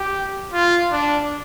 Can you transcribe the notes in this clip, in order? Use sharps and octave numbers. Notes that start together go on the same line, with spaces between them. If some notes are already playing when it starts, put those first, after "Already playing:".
Already playing: G4
F4
D4